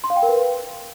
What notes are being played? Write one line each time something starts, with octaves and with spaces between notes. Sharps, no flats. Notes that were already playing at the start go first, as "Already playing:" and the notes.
C6
F5
G5
A#4
B4